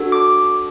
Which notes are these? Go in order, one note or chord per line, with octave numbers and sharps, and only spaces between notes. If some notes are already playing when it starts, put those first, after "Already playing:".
Already playing: D4 F#4 A4
D6